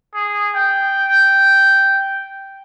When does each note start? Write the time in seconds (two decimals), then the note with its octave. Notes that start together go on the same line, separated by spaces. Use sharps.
0.14 G#4
0.56 G5